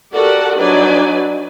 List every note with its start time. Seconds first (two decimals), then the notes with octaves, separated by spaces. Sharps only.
0.13 F#4 G4 A4 A#4 D5 F#5
0.58 F#3 D4 D#4 B4 D5 G#5